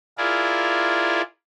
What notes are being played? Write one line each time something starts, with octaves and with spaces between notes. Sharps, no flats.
E4 F4 G#4 A#4 D5